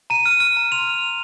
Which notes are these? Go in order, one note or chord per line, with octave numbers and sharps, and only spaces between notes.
A#5 D#7
F6
F6
A#5
C6 F7
F6
F6